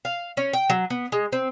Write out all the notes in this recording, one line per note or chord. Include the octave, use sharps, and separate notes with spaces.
F5
C#4
G5
F#3
B3
G#3
C4